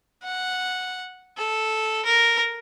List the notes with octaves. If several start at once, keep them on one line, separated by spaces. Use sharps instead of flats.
F#5
A4
A#4